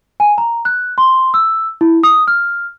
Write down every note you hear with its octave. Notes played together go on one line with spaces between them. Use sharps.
G#5
A#5
F#6
C6
E6
E4
D#6
F6